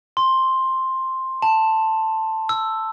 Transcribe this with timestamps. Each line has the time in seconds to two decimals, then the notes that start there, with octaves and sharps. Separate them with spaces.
0.17 C6
1.42 A5
2.49 E6